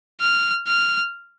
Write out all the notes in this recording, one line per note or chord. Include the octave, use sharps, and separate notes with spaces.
F6
F6